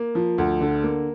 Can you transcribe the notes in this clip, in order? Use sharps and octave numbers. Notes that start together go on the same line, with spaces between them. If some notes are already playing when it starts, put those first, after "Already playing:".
Already playing: A#3
F3
D2
D3
A#3